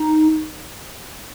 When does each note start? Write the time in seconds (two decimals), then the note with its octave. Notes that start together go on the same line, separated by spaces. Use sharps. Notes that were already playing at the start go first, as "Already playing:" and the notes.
Already playing: D#4